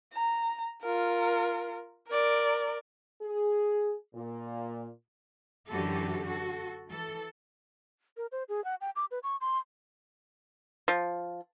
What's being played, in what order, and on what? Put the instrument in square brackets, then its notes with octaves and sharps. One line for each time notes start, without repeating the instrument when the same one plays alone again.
[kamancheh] A#5
F4 A#4
A#4 D5
[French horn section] G#4
A#2
[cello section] F#2 D3 E3 F#4 G4 A4
F#4 A4
E3 A4
[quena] A#4
C5
G#4
F#5
G5
D6
B4
C#6
C6
[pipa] F3